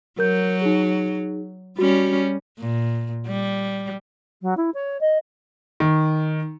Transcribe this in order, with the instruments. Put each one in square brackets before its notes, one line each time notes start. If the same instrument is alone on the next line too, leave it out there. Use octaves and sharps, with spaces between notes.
[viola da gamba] F#3 [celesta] A#4 G6
[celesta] D#4 G#4
[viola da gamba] G3 C#4 [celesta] F#4
[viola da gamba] A#2
G3
[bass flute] F#3
E4
C#5
D#5
[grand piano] D#3